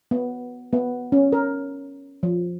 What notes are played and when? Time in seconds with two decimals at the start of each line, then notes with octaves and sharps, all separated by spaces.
0.11 B3
0.73 B3
1.12 C#4
1.32 A#4
2.23 F3